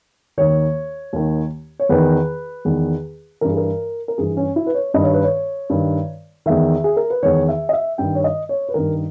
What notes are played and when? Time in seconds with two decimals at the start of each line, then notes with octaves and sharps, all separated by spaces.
0.38 D#2 D#3 C#5
1.13 D#2 D#3
1.80 C#5
1.89 E2 D#3 B4
2.65 E2 D#3
3.41 G2 E3 A#4
3.50 G#4
3.57 A#4
4.08 A#4
4.18 G2 E3 G#4
4.37 C#4
4.56 E4
4.67 B4
4.74 C#5
4.94 G2 D#3 D#5
5.03 C#5
5.13 B4
5.23 C#5
5.70 G2 D#3
6.46 E2 D#3 E5
6.84 G#4
6.97 A#4
7.10 B4
7.23 E2 D#3 C#5
7.48 E5
7.69 D#5
7.73 E5
7.98 G2 D#3 G5
8.15 C#5
8.24 D#5
8.49 C#5
8.69 B4
8.74 G2 D#3 A#4